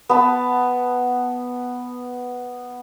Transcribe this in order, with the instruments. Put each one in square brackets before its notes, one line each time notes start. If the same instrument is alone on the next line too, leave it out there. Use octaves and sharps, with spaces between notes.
[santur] B3 A5